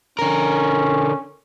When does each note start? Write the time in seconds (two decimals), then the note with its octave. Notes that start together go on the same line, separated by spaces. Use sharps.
0.19 D3 C#4 A#4